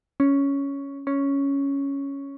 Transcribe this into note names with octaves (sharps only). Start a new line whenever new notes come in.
C#4
C#4